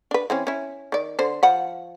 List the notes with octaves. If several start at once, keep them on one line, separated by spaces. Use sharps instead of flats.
D4 B4
E3 C4 C#4
C#4 E4
D#3 D5
D3 C5
F3 F#5 B5